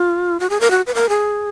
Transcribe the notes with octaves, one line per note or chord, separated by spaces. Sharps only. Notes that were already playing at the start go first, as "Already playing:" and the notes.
Already playing: F4
F#4
G#4
A#4
F#4
B4
A#4
G#4